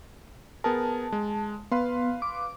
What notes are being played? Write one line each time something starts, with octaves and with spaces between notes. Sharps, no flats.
B3 G#4 A#4 A5
G#3
B3 B4 F5 C6
D6